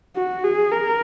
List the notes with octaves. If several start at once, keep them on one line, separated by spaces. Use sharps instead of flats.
F#4
G#4
A#4